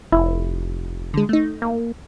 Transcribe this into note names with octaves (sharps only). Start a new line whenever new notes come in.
F1 E4
D3 G#3
A3 D#4
A#3